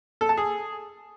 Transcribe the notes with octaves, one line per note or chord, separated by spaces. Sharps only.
A4
A5
G#4